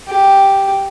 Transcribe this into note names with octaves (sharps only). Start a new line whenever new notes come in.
G4